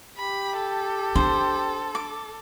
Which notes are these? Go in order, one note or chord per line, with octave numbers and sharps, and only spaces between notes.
G4 B5
A4
D4 C5
D6